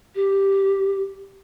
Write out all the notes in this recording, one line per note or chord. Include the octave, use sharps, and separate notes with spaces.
G4